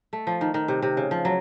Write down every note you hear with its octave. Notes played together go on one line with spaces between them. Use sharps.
A3
F3
D#3
D#3
C3
C3
C#3
F3
F#3